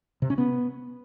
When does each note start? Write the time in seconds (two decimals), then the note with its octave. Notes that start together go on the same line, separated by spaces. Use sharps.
0.22 C3
0.30 C#4
0.38 B3